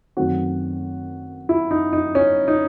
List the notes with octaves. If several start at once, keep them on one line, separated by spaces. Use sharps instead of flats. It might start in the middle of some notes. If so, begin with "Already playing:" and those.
F#2 D#3 A3 C4 F#4
E4
D#4
D#4
C#4
D#4